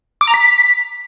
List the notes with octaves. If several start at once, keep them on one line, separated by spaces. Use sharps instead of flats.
D6
A#5
B6